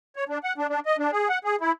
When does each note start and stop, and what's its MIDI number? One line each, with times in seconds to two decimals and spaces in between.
0.16 0.24 73
0.29 0.38 62
0.43 0.53 78
0.58 0.67 62
0.69 0.80 62
0.86 0.97 75
0.98 1.11 62
1.12 1.28 68
1.29 1.38 78
1.44 1.56 68
1.61 1.72 64